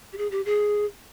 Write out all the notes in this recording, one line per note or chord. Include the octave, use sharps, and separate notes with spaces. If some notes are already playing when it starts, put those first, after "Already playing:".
G4
G#4
G4
G#4